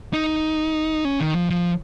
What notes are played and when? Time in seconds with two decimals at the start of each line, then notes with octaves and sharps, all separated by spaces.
0.13 D#4
1.05 C#4
1.20 D#3
1.36 F3
1.50 F3